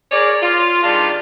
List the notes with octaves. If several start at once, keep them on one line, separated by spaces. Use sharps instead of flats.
G#4 A#4 C#5 D5
F4
G2 D#3 G#3 F4 D5 A5